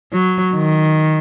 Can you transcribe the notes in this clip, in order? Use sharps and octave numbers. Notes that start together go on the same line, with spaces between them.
F#3
D#3